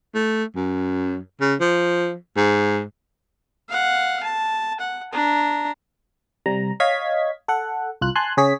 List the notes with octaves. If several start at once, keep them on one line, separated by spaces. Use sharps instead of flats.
A3
F#2
C#3
F3
G#2
F5 F#5
A5
F#5
D4 A#5
C3 G3 A#5
C#5 D#5 F5 G#6 B6
A4 F#5
C2 F4 F#6
G#5 A5 C6 F#6
C#3 G#4 C#5 B6